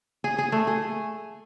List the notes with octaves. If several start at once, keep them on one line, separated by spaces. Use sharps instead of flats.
G#4
G#4
A3
G#4